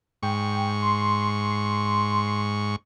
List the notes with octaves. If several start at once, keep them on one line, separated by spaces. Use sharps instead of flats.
G#2 G5 C#6
C6